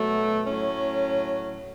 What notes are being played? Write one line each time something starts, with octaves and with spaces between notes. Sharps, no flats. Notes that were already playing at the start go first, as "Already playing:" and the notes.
Already playing: B2 F#3 A3
A2 F#3 C#4